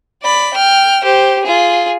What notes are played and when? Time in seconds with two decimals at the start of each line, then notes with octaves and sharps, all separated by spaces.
0.22 D5 B5
0.54 G5 F6
1.04 G4 C5
1.44 F4 G#4